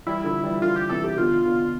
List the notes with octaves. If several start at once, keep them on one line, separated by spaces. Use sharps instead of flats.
E3 G3 E4
D3 F3
E3 G3
D3 F3 F4
G4
C3 E3 A4
G4
B2 D3 F4
B2 D3